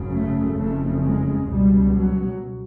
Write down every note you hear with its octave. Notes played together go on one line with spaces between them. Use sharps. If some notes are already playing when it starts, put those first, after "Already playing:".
Already playing: G#1 F#2 C#3
A3
F#1 F2 C#3 A3
G#3
C#2 B2 G3
F#3